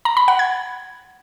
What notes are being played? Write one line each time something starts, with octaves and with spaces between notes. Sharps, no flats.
A#5
B5
F#5
G#6